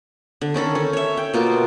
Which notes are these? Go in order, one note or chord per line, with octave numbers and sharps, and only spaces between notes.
D3
D#3 C#4 A4 B5
C#4
C#5 E5
G5
B2 A#3 F4